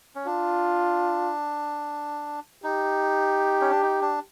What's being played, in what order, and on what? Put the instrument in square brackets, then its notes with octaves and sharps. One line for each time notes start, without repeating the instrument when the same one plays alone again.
[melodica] C#4
[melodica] D4 [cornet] F4
[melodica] D#4 [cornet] G4
[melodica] C#4
D4
D#4
D4